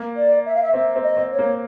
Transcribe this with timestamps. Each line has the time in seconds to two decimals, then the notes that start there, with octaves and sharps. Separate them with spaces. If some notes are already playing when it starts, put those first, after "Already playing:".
Already playing: A#3
0.16 D5
0.46 E5
0.54 F5
0.62 E5
0.74 C4 E5
0.96 C4
1.02 D#5
1.17 C4
1.32 C#5
1.39 A#3